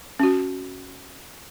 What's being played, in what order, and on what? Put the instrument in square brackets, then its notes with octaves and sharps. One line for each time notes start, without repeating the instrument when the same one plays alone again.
[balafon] C#4 F#4